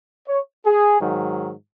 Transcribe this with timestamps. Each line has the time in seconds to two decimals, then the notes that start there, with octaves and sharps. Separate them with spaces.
0.28 C#5
0.64 G#4
1.00 G#2 D#3 F#3